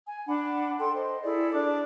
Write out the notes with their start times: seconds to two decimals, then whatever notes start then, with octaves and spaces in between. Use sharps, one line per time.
0.08 G#5
0.28 D4 F#5 B5
0.80 A4 G5 C6
0.95 C5 D#5
1.24 E4 G#4 A4 D5
1.53 D4 D6